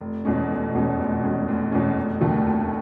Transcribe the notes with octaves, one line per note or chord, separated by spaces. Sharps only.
F1
E2 B2 G#3 C#4
F1
E2 B2 G#3 C#4
F1
E2 B2 G#3 C#4
F1
E2 B2 G#3 C#4
F1
D#2 D3 F#3 A3
F1